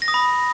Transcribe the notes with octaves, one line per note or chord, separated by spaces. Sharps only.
A#6
D#6
B5